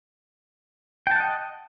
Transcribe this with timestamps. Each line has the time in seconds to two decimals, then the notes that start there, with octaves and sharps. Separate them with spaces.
1.07 G5
1.11 A5
1.16 F#5
1.20 D#5